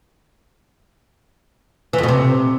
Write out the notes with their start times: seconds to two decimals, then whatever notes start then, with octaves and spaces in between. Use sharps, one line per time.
1.93 E3
1.98 F2
2.03 B2
2.08 C3